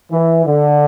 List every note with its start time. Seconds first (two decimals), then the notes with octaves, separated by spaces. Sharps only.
0.11 E3
0.46 D3